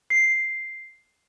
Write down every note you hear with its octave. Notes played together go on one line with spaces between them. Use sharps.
C7